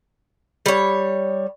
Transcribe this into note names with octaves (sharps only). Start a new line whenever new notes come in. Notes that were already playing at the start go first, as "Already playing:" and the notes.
G3 C#5